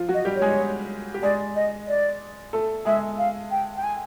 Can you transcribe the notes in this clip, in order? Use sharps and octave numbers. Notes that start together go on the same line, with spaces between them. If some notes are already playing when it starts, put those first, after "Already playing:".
Already playing: F3 F4
F#3 F#4
D#5
G3 G4
C#5
G#3 G#4
G4
G#3 G#4 D5
D#5
D5
A3 A4
G#3 G#4 E5
F5
G5
G5
G#5